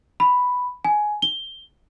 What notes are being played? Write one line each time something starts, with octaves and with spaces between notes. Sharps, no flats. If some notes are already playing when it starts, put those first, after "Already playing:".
B5
G#5
G7